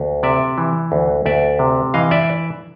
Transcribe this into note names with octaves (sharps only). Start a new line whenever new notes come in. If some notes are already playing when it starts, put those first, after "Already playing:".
Already playing: D2
C3 D5 E5
E3
D2
D2 D5 E5
C3
E3 D#5 F5
D5 E5